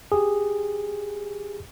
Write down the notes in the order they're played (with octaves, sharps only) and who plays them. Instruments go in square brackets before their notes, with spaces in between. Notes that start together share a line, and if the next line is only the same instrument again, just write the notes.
[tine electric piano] G4 G#4